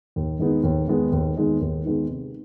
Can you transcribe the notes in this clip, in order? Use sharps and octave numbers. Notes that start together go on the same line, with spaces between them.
D#2
D#3 G#3 B3 D#4
D#2
D#3 G#3 B3 D#4
D#2
D#3 G#3 B3 D#4
D#2
D#3 G#3 B3 D#4
C3